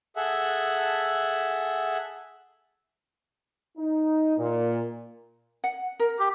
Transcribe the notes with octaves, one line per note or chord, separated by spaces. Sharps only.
G#4 A4 E5 F#5
D#4
A#2
F#5
A#4
G4